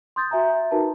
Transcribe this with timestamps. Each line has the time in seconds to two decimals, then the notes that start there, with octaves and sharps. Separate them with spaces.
0.16 C6 D#6 G6 A6
0.31 F#4 E5 G#5 A#5
0.71 D#4 F#4 A#4 B4 A5